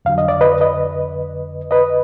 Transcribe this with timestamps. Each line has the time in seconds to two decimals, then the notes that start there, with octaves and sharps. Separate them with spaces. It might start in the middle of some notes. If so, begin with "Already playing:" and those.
0.05 F2 D3 F#3 F5
0.18 D#5
0.28 D5
0.41 B4 D#5
0.61 B4 D#5
1.71 B4 D#5